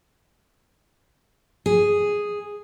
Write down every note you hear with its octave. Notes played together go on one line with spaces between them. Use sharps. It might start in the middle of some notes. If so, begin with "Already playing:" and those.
G#4